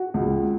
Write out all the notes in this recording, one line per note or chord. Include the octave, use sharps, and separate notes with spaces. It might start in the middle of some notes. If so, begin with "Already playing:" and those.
Already playing: F#4
C#2